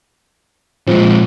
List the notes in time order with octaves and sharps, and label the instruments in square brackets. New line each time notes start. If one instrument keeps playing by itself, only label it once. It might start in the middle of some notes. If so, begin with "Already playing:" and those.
[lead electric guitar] A#2 G#3 [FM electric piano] F3 C4